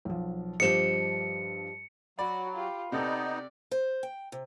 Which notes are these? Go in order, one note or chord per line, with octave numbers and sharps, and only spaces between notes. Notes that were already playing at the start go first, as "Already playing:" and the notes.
B1 F3
G2 F3 G4 C5 D#5 C#7 E7
F#3 F#4 D5 B5
F4 G4
C3 B3 D#4 A4 D5
C5
G5
C3